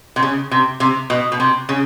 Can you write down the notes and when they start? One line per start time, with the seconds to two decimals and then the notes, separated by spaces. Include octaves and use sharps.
0.16 C3
0.23 C#3
0.51 C3
0.80 C3
1.10 B2
1.32 B2
1.40 C3
1.69 C#3